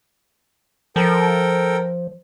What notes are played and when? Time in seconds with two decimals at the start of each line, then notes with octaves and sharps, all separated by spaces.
0.96 F3 A4 A#4 G5